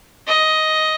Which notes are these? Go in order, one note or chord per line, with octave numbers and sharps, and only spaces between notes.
D#5